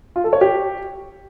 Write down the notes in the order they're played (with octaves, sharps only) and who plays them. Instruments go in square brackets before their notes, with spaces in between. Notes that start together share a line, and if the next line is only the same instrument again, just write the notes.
[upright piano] F4
A4
C#5
G4